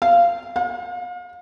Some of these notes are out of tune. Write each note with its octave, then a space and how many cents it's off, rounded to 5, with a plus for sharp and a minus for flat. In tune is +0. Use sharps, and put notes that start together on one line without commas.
F5 -15
F5 +40